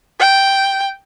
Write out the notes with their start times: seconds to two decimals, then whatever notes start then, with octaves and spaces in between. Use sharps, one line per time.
0.20 G5